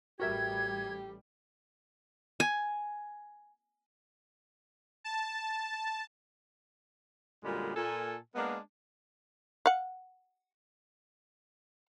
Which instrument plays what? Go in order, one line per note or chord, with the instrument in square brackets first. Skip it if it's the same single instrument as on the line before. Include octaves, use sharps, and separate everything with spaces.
[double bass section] A1 G3 [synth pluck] F#4 A#4 E5 [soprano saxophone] G4 [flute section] G#6
[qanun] G#5
[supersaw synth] A5
[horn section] F#2 A#2 D3 G3 G#3
A#2 A4 G#5
G#3 A#3 B3 D4 A#4
[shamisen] F5 F#5